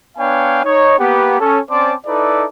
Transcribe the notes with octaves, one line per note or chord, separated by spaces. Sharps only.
B3 D4 C#5 F5 G5 G#5
D#4 C#5
A#3 B3 G4
C#4 A4
C4 C#4 C5 D5 A5 D6
D#4 E4 A4 B4 D5